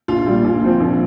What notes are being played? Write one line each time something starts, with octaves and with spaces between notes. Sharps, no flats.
A#1 F4
A#2 G3
A#1
A#2 F3 C4
A#1